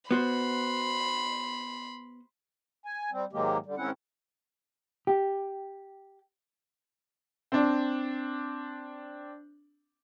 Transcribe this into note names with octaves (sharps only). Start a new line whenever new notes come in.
B3 F#4 C5 B5 C6
G#5
G3 C4
G#2 D#3 F#3 G#3 A#3 G4
D3 G3
G#2 D#3 C4 C#4 E4 F#5
G4
C4 D4